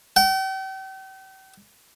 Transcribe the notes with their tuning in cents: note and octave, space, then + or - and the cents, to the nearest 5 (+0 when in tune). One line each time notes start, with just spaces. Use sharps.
G5 -40